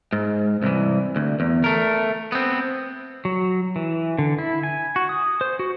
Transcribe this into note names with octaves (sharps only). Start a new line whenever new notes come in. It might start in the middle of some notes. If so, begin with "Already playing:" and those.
G#2
C2 E3
D2
E2
A3 A#4
B3 C4
F#3
E3
D3
E4
G#5
F#4
D#6
C5
F#4